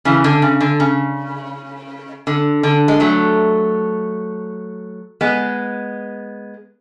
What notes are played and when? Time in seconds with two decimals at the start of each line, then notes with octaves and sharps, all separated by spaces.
0.05 C#3 E3
0.24 D3
0.42 C#3
0.61 D3
0.80 C#3
2.27 D3
2.63 D3
2.88 G#3
3.00 F#3 A3
5.21 G#3 B3